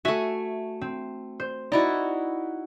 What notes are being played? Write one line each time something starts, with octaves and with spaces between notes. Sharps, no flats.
A3 F#4 E5 G#5
C4
C5
D#4 E4 F#4 D5